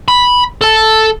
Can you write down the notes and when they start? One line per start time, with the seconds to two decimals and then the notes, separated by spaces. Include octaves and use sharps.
0.08 B5
0.61 A4 A5